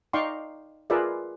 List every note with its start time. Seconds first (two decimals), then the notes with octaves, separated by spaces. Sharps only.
0.13 D#4 D5 F5 G5 C6 C#6
0.90 F4 G#4 A#4 B4 D5 E5